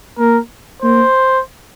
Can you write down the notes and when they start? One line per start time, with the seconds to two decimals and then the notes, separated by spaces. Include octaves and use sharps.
0.19 A#3 A#4
0.82 A#3 C5